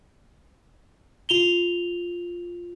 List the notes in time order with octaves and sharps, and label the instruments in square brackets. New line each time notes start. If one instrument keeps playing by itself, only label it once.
[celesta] F4 F7 G7